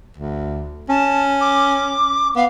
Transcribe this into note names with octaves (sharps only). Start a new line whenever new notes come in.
D2
C#4 A5
D6
B3 F5